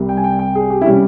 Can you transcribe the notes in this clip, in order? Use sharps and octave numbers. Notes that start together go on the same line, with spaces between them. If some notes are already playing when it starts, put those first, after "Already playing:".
Already playing: C2 C3 G3
G5
G#5
G5
G5
G#4
G4
E4
C3 G3 C#4